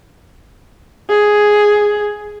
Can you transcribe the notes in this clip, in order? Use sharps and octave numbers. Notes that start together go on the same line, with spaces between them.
G#4